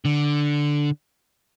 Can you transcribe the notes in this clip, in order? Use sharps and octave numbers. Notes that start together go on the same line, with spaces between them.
D3